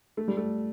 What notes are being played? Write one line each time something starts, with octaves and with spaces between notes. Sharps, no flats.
A3
G3
A3